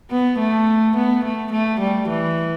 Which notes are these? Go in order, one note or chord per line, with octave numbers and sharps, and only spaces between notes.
B3
A3
B3
A3
A3
G3
E3